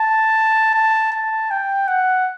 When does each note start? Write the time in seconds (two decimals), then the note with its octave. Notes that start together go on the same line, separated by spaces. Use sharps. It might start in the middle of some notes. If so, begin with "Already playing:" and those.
Already playing: A5
0.74 A5
1.12 A5
1.51 G5
1.87 F#5